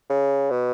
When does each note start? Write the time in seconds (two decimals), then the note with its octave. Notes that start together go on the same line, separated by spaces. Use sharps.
0.10 C#3
0.51 B2